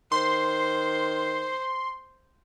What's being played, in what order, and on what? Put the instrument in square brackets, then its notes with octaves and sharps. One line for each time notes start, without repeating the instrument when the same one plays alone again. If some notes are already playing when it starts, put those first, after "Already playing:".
[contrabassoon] D#3 [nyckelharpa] C5 [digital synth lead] C6